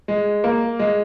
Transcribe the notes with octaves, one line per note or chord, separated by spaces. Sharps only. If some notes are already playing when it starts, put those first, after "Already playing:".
G#3
A#3
G#3